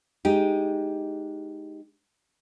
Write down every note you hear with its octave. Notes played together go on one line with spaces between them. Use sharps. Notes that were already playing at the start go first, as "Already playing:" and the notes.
G#3 D#4 G4